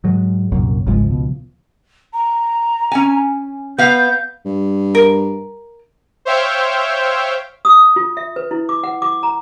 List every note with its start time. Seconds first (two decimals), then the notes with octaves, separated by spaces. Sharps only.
0.04 G#2 F#3 G#3
0.52 C2 F#2 A#2
0.87 G1 C#2 G#2 F3 G#3
1.10 B2
2.13 A#5
2.92 C#4 G#5
3.78 B3 F5 G6
4.45 G2
4.95 A#4
6.25 C5 C#5 E5 F5 G5
7.65 D#6
7.96 F4
8.17 E5
8.36 B4
8.51 E4
8.69 D6
8.84 F#5
9.02 D6
9.23 A#5